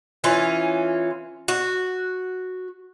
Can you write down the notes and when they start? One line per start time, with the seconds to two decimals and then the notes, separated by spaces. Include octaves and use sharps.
0.24 E3 C#4 F4
1.48 F#4